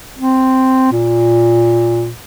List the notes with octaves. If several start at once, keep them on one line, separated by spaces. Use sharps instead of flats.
C4
A#2